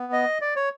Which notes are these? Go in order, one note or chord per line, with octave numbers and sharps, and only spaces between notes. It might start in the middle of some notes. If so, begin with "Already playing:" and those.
Already playing: B3
D#5
D5
C#5